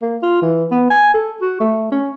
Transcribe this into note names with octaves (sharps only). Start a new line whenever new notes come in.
A#3
F4
E3
B3
G#5
A4
F#4
A3
C#4